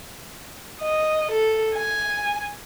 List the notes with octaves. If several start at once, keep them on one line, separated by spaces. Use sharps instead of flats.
D#5
A4
G#5